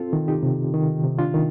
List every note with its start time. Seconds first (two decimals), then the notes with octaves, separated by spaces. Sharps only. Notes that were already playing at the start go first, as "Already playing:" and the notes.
Already playing: C4 F4 A4
0.13 D#3
0.28 D#4 G4
0.43 C3
0.74 D#3
1.04 C3
1.19 D4 F4
1.34 D#3